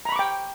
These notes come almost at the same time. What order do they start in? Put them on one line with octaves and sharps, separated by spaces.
A#5 B5 C#6 D6 G5